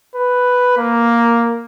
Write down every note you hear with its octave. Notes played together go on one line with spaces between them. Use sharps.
B4
A#3